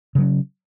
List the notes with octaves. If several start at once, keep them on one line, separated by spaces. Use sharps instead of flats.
C#3 F#3 C#4